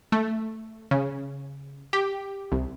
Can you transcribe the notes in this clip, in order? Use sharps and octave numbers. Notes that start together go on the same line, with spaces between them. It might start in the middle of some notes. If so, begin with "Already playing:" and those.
A3
C#3
G4
C2